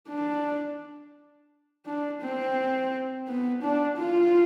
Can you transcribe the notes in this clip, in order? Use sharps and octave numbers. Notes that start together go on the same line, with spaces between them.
D4
D4
C4
B3
D4
F4